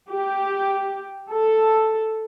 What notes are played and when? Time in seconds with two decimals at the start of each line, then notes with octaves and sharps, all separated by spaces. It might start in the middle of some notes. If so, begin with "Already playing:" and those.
0.11 G4
1.31 A4